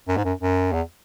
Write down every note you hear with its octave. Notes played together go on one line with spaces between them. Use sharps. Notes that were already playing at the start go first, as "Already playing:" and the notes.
F#2
G#2
F#2
F#2
E2